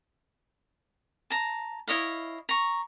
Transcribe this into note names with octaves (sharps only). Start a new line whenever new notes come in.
A5 A#5
E4 C#5 D#5 F5
A#5 C#6